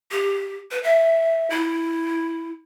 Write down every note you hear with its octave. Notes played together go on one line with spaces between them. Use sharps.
G4
B4
E5
E4